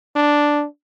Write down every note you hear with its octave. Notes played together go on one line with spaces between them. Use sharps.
D4